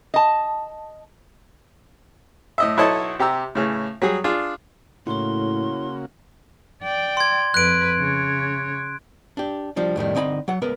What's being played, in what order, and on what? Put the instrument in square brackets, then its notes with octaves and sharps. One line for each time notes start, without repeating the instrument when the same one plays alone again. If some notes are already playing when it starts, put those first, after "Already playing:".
[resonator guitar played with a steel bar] D#5 A5
[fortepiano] A2 D#5 E5
B1 E4 A4 C#5 D#5 A5
C3 G4 A#5 E6
A2 C#3 E3
F#3 G3 G#4
D4 F4 G#4
[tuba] A2 [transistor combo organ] C#3 A#3 F#4 [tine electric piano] E4 C#5 [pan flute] C6
[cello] D5 G5
[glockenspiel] C6 G#6
[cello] F2 B4 [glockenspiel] F#6 D7
[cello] C#3 C#5
[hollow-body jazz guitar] D4 G4
F3 G3 D4
F2 A2 D#3 G3
D3 C4 D#4 G#5 B5
F#3 F#5
C#2 B3 A#4 B4